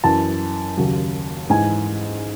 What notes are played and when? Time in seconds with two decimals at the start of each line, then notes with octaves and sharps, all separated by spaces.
0.04 F#2 E3 A5
0.77 D#2 C#3 F#3
1.50 G#2 E3 G#5